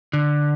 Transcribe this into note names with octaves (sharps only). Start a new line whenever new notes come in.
D3